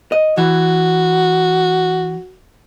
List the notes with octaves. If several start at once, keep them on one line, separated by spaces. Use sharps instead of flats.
D#5
E3 F#4